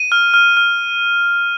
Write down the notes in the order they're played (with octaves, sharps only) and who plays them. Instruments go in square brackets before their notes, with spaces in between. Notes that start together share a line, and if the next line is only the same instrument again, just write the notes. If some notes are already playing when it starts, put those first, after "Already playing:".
Already playing: [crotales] D#7
F6
F6
F6